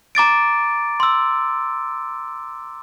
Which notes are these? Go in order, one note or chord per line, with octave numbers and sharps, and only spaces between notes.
A#5 D6 A6 D7
C6 E6